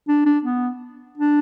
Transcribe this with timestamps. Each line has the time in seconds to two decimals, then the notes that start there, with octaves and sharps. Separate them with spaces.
0.08 D4
0.26 D4
0.44 B3
1.18 D4